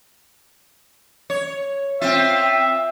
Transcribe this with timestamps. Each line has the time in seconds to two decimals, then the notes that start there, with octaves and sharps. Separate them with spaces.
1.30 C#5
2.01 C4 F4 E5